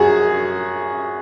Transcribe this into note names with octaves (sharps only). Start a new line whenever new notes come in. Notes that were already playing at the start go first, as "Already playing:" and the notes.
Already playing: F#2 F#4 G#4